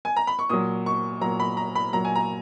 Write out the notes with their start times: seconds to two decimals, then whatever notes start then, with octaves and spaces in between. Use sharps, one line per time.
0.05 G#5
0.16 A#5
0.27 B5
0.39 C#6
0.49 A#2 F#3 D#6
0.86 C#6
1.21 A#2 F#3 A#5
1.40 B5
1.57 A#5
1.75 B5
1.93 A#2 F#3 A#5
2.05 G#5
2.15 A#5